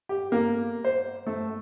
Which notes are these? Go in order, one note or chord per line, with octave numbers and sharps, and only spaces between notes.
G4
A#3
C5
A3